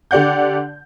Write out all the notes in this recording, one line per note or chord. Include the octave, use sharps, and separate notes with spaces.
D3 G4 D5 F#5 G6